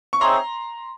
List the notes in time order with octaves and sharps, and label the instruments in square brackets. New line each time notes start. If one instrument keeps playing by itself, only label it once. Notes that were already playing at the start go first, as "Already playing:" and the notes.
[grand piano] C#6
[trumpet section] C4 D#4 G#4 C#5 E5 [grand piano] A#5 C6